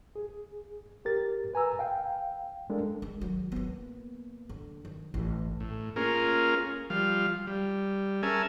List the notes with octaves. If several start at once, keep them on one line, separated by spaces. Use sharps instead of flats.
G#4
G4 A#4 A6
B4 G#5 A#5 E6
F5 G5
G#3 D4 A4 A#4
G#3
D#3 F#3
A#3 B3
D3
D#3
A1
A2
A#3 C#4 F4 G#4 A#4
F3 G3 F5
G3
C#4 G#4 A#4 E5 G#5 A5